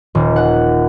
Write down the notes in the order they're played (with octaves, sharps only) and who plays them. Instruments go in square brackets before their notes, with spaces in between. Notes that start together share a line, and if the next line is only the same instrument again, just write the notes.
[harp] D#1
F#5